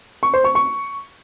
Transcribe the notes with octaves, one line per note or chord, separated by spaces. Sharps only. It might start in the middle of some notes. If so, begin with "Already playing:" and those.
C#6
C5
C#6
C#6